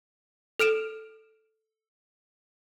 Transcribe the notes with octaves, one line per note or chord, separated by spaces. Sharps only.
A4 F6 D7 E7